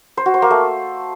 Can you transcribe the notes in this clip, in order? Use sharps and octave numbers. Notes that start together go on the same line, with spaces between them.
C5
F#4
C5
A#3
A3